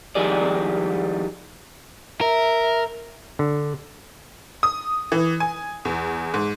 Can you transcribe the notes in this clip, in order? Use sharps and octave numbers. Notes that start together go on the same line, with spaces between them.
D#3 F3 G3 G#3 G#4 D5
A#4 E5
D3
D#6
E3
G#5
E2
G#2